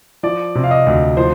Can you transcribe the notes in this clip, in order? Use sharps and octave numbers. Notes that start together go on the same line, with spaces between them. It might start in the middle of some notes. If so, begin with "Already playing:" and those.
F3 D5
C3
F5
D#5
D2
F3 C5